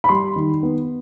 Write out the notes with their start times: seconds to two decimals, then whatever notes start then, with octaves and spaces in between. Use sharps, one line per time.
0.04 B5
0.09 G3 C6
0.36 D#3
0.63 B3